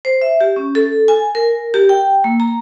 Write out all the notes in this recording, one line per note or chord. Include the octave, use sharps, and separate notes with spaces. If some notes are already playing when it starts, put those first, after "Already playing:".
C5
E5
G4
C#4
A4
G#5
A#4
G4
G5
A#3
A#5